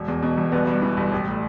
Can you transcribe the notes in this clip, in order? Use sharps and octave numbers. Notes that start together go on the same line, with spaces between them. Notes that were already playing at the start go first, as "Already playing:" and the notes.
Already playing: E1
E2
B2
E1
G1 B2 B3
G2
E3
G1
A1
A2